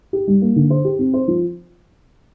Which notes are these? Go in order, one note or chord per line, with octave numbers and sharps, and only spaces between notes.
G4
G3
A#3
D3
C5
G4
C4
C5
F3